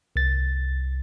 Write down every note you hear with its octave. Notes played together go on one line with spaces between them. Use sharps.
C2 A6